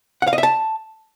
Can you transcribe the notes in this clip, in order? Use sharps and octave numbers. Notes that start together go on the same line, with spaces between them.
F#5
F5
D#5
E5
A5